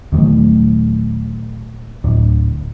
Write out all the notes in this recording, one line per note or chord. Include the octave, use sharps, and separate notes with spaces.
D#1 D#3 F#3 A3
D1